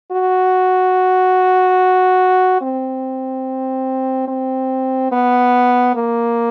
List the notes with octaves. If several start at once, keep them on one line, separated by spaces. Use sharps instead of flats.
F#4
C4
C4
B3
A#3